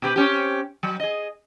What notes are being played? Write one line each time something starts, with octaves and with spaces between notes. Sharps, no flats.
B2 G4 B4
C4 C#4 G4
F#3
G#4 D#5